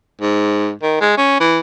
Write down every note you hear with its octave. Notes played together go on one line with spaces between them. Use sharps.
G#2
D#3
G#3
C#4
E3